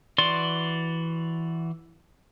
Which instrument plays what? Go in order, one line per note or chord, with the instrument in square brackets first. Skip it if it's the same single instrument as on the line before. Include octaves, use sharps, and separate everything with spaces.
[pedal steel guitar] E3 F#4 D5 C6